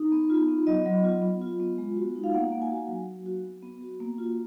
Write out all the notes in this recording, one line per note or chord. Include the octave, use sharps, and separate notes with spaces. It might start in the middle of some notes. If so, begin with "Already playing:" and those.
Already playing: D#4
B3
F4
B3
F#3 D#5
F#3
F4
B3
F4
B3
G#3
F#4
D#4
F5
A#3 F#5
A#3
G#5
F#4
F#3
F#3
F#4
B3
B3
F#4
A#3
F4